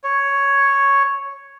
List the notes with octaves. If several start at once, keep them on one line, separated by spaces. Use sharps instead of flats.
C#5